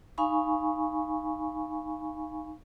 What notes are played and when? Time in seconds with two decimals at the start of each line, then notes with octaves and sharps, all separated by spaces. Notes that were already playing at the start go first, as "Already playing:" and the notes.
0.18 D#4 F5 G#5 B5 C#6